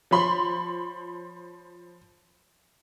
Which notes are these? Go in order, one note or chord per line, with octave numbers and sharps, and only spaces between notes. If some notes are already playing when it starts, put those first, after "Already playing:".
F3 C#5 B5 C6